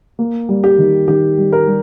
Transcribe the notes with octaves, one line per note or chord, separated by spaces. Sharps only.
A#3
G3
G4
D#3
D#3 G4
G3
A#4
G3